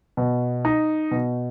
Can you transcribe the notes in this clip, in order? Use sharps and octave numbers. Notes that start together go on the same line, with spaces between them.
B2
D#4
B2